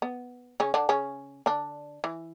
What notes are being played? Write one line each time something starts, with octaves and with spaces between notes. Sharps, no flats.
B3
C#3 C#4
D3 D4
C#3 C#4
D3 D4
E3